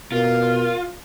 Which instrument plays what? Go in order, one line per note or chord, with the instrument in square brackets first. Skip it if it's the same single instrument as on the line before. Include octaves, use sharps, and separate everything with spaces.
[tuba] B2 [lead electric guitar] F4 [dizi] A#4